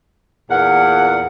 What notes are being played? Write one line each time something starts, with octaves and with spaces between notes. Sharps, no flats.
E2 A#2 A#4 F#5